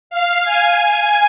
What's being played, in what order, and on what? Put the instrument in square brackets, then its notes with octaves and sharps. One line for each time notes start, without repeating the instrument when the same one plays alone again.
[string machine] F5
G#5